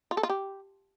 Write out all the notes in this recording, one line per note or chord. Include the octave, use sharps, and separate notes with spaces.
F4
A4
F4
G4